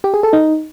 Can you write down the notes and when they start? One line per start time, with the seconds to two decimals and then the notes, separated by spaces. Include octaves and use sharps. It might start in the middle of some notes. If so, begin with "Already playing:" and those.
0.04 G4
0.14 G#4
0.23 A4
0.33 D#4